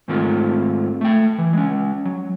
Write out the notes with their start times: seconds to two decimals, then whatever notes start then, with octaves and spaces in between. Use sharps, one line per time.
0.08 G#2 D#3 G#3 A3 C4 F4
1.01 A3 G5
1.38 E3
1.53 G#3 C#4
2.05 F#3